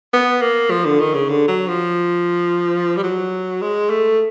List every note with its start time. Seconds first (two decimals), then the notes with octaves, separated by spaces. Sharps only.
0.13 B3
0.41 A#3
0.70 F3
0.85 D3
1.00 D#3
1.14 C#3
1.29 D3
1.48 F#3
1.68 F3
2.97 G3
3.03 F#3
3.61 G#3
3.90 A3